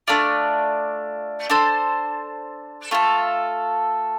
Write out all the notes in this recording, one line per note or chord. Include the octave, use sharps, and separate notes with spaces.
A3 D4 F4 D5
D4 A4 C5
A3 F4 A4